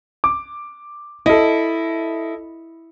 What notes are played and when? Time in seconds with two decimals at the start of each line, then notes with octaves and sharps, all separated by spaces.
0.24 D6
1.26 E4 A4 D#5